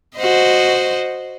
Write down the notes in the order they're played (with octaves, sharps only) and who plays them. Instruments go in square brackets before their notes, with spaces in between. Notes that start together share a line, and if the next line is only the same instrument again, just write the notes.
[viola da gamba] F#4 C5 D#5